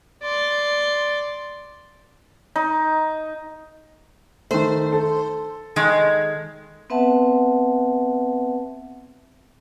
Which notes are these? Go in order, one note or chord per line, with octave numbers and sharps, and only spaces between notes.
D5 C6
D#4
D#3 A3 C5
A4
D#3 G#3
B3 C4 B4 E5 F#5 A5